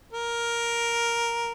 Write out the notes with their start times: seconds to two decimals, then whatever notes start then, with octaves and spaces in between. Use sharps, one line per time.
0.13 A#4